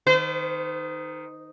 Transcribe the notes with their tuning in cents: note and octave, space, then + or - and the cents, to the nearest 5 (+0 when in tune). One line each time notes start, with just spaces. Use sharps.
D#3 +0 C5 -40